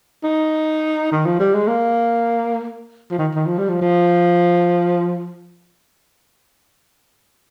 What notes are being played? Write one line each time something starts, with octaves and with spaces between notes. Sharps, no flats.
D#4
D#3
F3
G3
G#3
A#3
F3
D#3
D#3
F3
G3
F3
F3